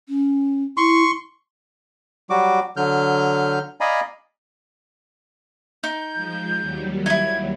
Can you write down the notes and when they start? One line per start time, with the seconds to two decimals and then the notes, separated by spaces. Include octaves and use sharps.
0.08 C#4
0.77 E4 C6 C#6
2.30 F#3 G3 F#4 D6
2.77 D3 F#3 F6 G6
3.81 D5 D#5 F5 G#5 A#5 B5
5.83 D#4 G6
6.14 F3 G#3
6.60 D#2 F#3 G3
7.06 D#4 E4 G#6